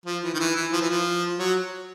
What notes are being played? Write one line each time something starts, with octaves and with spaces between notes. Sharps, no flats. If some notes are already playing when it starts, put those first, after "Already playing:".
F3
E3
D#3
E3
E3
F3
E3
F3
F#3